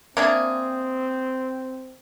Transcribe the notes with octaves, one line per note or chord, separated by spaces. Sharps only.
A#3 C4 D4 G#4 E5